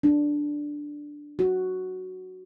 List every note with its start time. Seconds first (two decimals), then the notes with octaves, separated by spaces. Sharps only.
0.03 D4
1.39 F#4